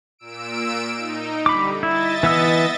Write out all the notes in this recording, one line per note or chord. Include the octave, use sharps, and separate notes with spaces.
A#2 E6 D7
D#4
D3 G3 B5 D6
E4 D#5 E5 A6
E3 B3 E6